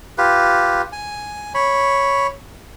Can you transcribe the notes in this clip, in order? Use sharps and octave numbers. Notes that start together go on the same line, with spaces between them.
F4 G4 B4
G#5
C#5 B5